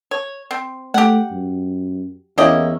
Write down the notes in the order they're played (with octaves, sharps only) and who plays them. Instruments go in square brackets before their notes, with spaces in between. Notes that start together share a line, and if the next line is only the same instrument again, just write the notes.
[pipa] C#5
C4
[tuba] A3 [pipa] G4 F#5
[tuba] F#2
[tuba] E2 [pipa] A#3 G4 D#5 [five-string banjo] C#4 E4